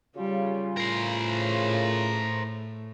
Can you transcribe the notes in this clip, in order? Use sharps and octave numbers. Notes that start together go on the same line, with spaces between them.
C#3 G3 F4
A2 A#4 C5